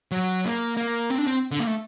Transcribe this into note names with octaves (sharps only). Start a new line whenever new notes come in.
F#3
A#3
A#3
C4
D4
C4
D3
A#3
A3